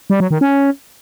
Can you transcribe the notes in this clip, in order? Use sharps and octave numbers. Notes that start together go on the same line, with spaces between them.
G3
F#3
D#3
C#4